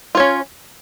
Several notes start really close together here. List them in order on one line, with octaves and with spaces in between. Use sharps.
F4 C#5 C#4